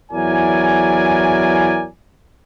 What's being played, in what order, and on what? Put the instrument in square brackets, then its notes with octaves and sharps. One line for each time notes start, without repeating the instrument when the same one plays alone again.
[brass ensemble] E2 F#3 E4 A#4 D5 G#5